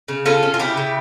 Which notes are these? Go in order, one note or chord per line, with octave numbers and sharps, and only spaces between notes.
C#3
C#4 F4 A4
C#4
F4
C#3 E4 G4
C#3